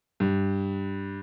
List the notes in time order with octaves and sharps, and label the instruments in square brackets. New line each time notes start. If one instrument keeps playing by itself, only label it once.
[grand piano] G2